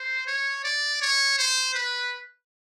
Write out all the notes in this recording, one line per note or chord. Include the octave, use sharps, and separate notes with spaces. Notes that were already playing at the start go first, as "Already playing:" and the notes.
Already playing: C5
C#5
D5
C#5
C5
B4